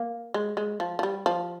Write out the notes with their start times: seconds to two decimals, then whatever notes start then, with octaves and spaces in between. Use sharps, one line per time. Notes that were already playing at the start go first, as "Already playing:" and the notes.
Already playing: A#3
0.34 G#3
0.57 G#3
0.80 F3
0.99 F3
1.03 G3
1.26 F3